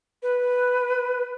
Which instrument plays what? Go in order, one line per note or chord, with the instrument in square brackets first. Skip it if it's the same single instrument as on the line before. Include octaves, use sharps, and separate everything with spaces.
[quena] B4